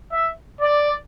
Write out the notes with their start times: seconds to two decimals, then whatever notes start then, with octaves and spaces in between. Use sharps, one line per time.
0.11 E5
0.60 D5